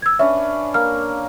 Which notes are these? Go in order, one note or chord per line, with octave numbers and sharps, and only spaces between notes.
E6 G#6
C#4 D4 B4 E5
A#3 F6